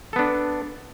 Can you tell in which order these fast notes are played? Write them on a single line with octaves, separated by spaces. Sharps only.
A4 B3 D4